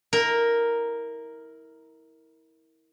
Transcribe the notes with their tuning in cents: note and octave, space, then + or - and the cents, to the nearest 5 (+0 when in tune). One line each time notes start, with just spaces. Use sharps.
E4 -30 A#4 +0